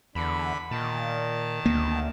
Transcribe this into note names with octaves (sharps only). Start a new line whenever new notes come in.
E2 D3 B5
A#2 D#3 A5
D2 A#3